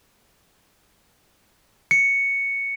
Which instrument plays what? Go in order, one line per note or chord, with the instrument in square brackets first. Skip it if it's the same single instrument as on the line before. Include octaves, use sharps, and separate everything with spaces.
[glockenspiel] C#7